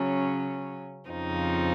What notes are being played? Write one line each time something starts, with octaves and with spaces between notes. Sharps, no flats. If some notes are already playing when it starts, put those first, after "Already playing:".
Already playing: C#3 F#3 C#4
F2 C#3 F3 C4 D#4